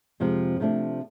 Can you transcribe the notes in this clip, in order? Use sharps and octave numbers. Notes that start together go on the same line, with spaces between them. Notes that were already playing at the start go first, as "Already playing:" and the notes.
F2 C3 F3 G#3
C3 F3 A3 D4